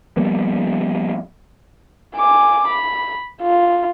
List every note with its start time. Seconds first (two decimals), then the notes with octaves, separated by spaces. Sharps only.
0.17 F3 G3 A#3 B3
2.16 G#5 D6
2.68 B5
3.42 F4